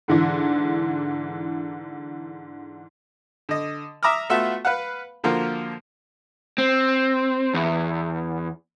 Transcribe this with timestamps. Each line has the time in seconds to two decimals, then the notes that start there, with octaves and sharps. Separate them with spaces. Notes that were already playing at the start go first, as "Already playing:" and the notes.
0.08 G#2 D3 E3
3.49 D3 D#5
4.03 E5 A#5 D6 D#6 F6
4.30 A3 B3 F4 F#4 A4 E5
4.65 B4 F5 F#5
5.24 D3 F3 A#3 F4 F#4 A#4
6.58 C4
7.54 E2